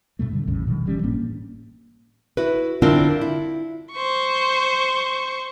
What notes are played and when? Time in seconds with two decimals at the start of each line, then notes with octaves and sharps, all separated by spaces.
0.19 G2 B2 A3
0.32 B2 D3 G3
0.47 A1 E2 A2 C#3
0.67 B2 D#3 F3 G3
0.86 G1 E3 G3 C#4
1.04 A2 A#3 C#4 D4
2.37 E4 F#4 B4
2.82 D3 C4 D4 E4 F4 A#4
3.21 E4
3.93 C5 C#6